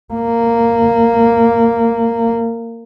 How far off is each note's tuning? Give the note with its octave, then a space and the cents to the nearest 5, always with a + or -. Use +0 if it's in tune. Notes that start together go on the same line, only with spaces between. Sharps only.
A#3 -10